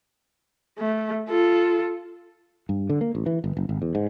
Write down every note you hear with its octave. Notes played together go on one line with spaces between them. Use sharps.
A3
F4 A4
G2
D3
A#3
A1
E3
G1
F#1
G#1
E2
G#2